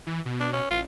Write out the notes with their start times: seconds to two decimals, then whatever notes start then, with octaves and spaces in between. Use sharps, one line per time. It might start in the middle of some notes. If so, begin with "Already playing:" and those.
0.07 E3
0.26 B2
0.40 D4
0.53 C#4
0.70 A1 F4